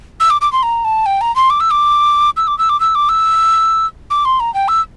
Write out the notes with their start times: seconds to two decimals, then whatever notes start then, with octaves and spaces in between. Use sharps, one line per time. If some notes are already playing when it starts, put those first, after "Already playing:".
0.20 E6
0.30 D6
0.41 D6
0.52 C6
0.63 A#5
0.84 A5
1.06 G5
1.21 A#5
1.36 C6
1.50 D6
1.60 E6
1.71 D6
2.37 E6
2.47 D6
2.59 E6
2.69 D6
2.80 E6
2.95 D6
3.09 E6
4.10 D6
4.25 C6
4.40 A#5
4.54 G5
4.68 E6